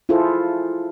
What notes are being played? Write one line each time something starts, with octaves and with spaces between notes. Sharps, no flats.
E4 F4 G#4 A4 C5